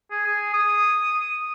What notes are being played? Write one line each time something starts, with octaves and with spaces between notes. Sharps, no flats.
G#4
G#4
D#6